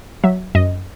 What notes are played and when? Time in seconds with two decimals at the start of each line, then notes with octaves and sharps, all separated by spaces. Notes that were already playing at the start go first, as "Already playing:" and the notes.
0.24 F#3 E5
0.55 F#2 D#5